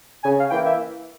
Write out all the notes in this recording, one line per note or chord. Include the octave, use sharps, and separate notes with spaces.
C#3 G#5
F5
E3 A#3 G5
E5